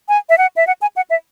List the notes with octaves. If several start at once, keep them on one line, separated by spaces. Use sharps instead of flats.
G#5
E5
F#5
E5
F#5
G#5
F#5
E5